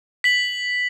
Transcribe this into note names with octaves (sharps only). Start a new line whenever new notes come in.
B6 F#7